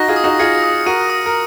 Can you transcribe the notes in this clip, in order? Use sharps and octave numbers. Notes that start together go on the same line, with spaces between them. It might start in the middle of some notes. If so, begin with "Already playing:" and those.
Already playing: D#4 F#4 A#6
F4 G#4
D#6
D#4 F#4
F4 G#4 C#7
D#6
F#4 A#4 D#7
D#6
A#4